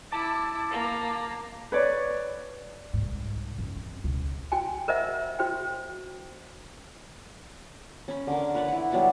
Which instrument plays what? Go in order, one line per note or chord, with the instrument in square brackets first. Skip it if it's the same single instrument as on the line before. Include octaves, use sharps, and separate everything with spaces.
[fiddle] E4 [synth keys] A5 D6 A6
[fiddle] A#3
[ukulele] B4 C#5 D5
[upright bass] C2 G#2
F#2
C4
C#2 B2
[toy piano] F#4 G5 G#5
A#4 C5 D#5 E5 F#5
F#4 C5 G5
[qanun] C#4 B5
D3 A#4
B4 C#5 D5 F#5
E4 F#5
F#3 G3 B3 A5